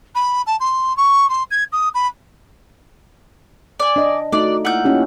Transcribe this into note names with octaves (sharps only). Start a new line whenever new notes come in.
B5
A5
C6
C#6
C6
G#6
D#6
B5
D5 G#5
D4 D#5
A3 D#4 F#4 D5
A#3 E4 F4 F#5 G6
C#4 D#4 G4